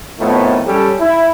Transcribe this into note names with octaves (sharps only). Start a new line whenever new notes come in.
F2 A2 D#3 F3 A3 B3
F#2 G3 C#4 G4 A4
E4